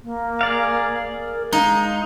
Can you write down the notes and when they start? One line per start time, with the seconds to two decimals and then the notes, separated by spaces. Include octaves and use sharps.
0.03 A#3
0.41 G#4 D5 F5
1.17 A#4
1.53 G#3 D#4 F5